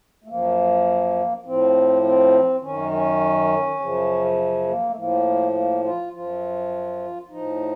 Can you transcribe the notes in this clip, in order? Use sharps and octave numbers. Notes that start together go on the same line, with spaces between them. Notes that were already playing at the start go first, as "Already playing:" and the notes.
A3
F#2 F3 A#3
A2 F3 C4
C4
F#2 D#3 C#4
C#4
F#2 C#3 F3
A#3
A3
A2 F3 A#3
A#3
F4
F#2 F3 F4
A2 F3 D#4